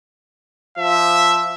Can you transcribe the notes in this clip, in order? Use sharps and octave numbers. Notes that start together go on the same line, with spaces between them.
F3 E5